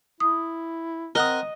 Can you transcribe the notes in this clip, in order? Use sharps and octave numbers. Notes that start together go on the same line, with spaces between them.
E4 D#6
C4 A#4 D#5 F#5 D#6